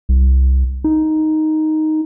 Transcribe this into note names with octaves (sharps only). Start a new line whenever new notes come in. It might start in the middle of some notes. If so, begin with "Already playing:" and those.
C2
D#4